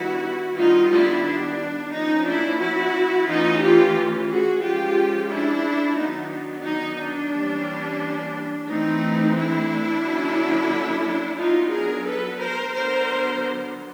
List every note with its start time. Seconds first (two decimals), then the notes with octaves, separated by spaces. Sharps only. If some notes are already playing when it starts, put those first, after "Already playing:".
Already playing: D#3 G3 B3 D4 E4 F#4
0.57 D#3 G3 B3 D4 D#4 F4
0.91 D4 E4
1.25 D4
1.92 F3 A#3 C#4 D#4
2.26 D4 E4
2.60 E4 F#4
3.27 E3 A3 C#4 D#4 F4
3.61 F4 G4
4.29 F#4 G#4
4.62 F3 G#3 C#4 F4 G4
5.30 D4 E4
5.97 D#3 F#3 B3 D4 D#4
6.65 D#4
6.99 D4
7.33 E3 G3 A#3 C#4
8.68 E3 A3 C4 D#4
9.36 D4 E4
10.04 D3 F#3 A#3 C#4
11.38 F#3 B3 D4 D#4 F4
11.72 G#4 A#4
12.06 A4 B4
12.40 A#4 C5
12.73 D3 F#3 B3 A#4 C5